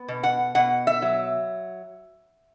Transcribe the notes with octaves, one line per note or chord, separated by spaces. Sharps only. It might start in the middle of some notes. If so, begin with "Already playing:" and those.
Already playing: B3
B2
F#5
B2 F#5
E5
F#3